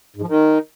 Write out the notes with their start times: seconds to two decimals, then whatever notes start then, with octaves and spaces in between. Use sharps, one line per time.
0.16 G#2
0.22 F3
0.28 D#3